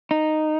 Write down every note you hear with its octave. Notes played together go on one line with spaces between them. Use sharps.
D#4